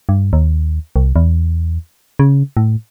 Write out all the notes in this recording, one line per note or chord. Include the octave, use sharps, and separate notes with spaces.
G2
D#2
C2
E2
C#3
A2